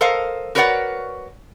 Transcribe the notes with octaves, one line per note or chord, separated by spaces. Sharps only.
A4 A#4 C5 D#5 F5
F#4 A#4 B4 C#5 D5 F#5